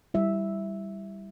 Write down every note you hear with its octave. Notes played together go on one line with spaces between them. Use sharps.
G3 E4 E5